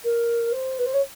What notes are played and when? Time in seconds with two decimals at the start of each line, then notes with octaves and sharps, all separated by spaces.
0.04 A#4
0.52 C5
0.78 B4
0.85 C5
0.93 C#5